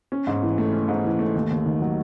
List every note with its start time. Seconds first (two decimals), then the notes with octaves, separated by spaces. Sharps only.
0.12 C#4
0.27 G#2
0.42 E3
0.58 A3
0.73 C#4
0.88 G#2
1.05 E3
1.19 A3
1.35 D#2
1.51 D#2
1.66 D#3
1.81 F#3